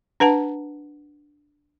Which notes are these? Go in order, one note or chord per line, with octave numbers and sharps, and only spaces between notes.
D4 B4 F#5 A5